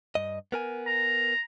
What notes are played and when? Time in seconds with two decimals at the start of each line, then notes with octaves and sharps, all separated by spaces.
0.15 G2 D#5
0.52 B3 A#4 G#5
0.87 A#5